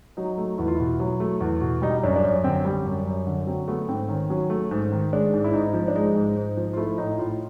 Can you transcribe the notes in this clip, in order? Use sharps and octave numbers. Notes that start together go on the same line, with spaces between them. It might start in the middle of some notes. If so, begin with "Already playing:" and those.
F#3 D#4
A3
E2 E4
F4
B2 E4
F#3
A3
E2
B2
G3 D#4
D#4
F#2 D4
D4
F#2 C#4
D3 C4
G3
F#2
F#2
D3
F#3 C4
A3 B3
G#2 C4
D#3 C#4
F#3 C#4
A3
G#2
D#3
G#3 D4
G#2
E4
G#2 D#4
F3
D4
G#3 D#4
G#2
G#2
F3
F4
A3 E4
A2 D#4
E4
A2 F4